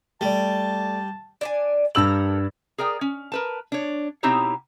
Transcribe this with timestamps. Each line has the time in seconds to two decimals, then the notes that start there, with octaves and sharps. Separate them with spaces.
0.21 G3 A3 D5 A5
1.41 D4 D5 G#5
1.95 G2 G4 A4 A#4 E6 F#7
2.78 G#4 A#4 D5 G5
3.01 C#4
3.32 A#4 B4 A5
3.72 D4 C#5
4.23 B2 C4 D#4 E4 G4 C#5